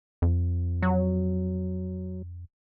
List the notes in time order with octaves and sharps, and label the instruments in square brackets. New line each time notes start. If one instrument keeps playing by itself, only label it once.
[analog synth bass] F2
[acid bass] F#3